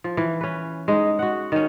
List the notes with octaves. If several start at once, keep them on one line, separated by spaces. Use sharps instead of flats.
F3
E3 F5
C#4 B4
G#3 D#4
F#4 F#5
D#3 C#4